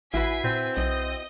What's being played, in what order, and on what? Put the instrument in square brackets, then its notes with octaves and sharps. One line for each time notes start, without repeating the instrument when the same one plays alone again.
[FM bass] A1 [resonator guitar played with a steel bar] E4 F#4 B4 [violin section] G#5 B6 C7
[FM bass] A#2 [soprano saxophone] C4
[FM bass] B1 [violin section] D#5